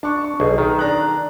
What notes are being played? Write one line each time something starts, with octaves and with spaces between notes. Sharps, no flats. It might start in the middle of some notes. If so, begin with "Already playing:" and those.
D4 A5 C#6
C#6
B1 G#4
D#3
D4 A#5 F#6